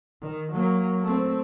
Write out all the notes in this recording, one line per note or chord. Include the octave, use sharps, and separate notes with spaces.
D#3
F#3 A#3
A3 C4